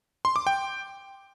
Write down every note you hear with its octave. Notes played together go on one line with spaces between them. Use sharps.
C6
D6
G5